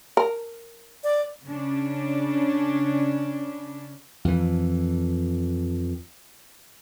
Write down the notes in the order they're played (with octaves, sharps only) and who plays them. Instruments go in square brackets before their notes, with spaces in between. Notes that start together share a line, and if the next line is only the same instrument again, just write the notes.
[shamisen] A#4
[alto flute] D5
[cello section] C#3 C#4 D4
[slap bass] F2 E3